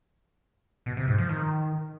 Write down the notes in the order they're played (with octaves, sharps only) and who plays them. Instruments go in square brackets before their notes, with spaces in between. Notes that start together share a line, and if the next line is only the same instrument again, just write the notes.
[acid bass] B2
C3
G#2
F3
D#3